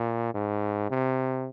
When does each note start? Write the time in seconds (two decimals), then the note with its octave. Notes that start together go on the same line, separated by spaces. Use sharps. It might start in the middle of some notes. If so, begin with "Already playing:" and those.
Already playing: A#2
0.34 G#2
0.90 C3